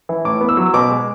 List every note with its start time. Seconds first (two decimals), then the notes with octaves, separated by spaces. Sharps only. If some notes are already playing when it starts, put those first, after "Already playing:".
0.09 E3
0.25 A2 D6
0.41 B3
0.49 E6
0.57 F#3
0.74 B2 D6
0.90 G#3